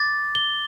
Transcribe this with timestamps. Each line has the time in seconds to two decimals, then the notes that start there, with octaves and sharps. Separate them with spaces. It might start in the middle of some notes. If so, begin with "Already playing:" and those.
Already playing: D6 A6
0.35 G7